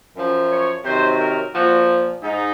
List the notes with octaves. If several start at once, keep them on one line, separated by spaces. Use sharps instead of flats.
F#2 F3
C#5
C3 D#3 F#3 C5
A#4
A#2 F3 F#4
G#2 D#4